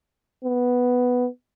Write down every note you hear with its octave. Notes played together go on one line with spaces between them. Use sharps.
B3